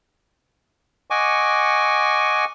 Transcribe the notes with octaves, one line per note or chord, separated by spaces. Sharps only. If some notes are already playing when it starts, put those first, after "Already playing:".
D#5 F#5 G#5 C#6 D6